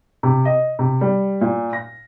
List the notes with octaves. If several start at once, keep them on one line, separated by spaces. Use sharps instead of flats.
C3
D#5
C3
G3
A#2
A#6